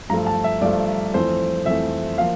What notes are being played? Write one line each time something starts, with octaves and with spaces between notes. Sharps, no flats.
G2 F3 A3 A#5
A5
E5
G2 F3 A3 D5
F2 E3 A3 C5
F2 E3 A3 E5
F3 A#3 F5